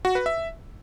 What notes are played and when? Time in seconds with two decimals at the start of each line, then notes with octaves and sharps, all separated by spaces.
0.05 F#4
0.15 B4
0.26 E5